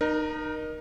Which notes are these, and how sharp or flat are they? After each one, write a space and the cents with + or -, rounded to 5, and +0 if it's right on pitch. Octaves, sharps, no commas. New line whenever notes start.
D#4 -25 A#4 +20